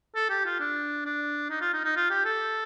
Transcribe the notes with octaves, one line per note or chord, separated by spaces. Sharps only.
A4
G4
F4
D4
D4
D#4
F4
D#4
D#4
F4
G4
A4